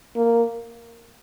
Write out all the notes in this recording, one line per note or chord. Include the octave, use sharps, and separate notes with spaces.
A#3